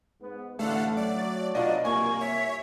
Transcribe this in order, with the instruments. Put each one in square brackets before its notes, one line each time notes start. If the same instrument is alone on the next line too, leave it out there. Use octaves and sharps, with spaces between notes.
[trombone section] G#2 B3
[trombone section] A1 D3 [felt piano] A3 [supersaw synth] A4 F5 F#5
[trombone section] F#3 [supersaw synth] D5
[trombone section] B2 F#3 [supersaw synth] D4 [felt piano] F4 D5 D#5
[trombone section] C2 [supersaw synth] A#3 [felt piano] G#5 [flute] C#6
[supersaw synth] C#5 [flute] E5